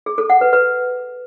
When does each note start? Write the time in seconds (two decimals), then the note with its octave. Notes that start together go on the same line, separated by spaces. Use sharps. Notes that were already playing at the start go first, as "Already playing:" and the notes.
0.06 G#4
0.18 A4
0.30 F#5
0.41 B4
0.53 B4